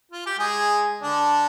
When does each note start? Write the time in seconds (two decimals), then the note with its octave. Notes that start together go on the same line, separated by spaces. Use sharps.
0.11 F4
0.26 G4
0.39 G#3 G#4
1.02 D3 D4